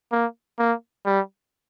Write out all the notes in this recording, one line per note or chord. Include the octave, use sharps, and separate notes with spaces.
A#3
A#3
G3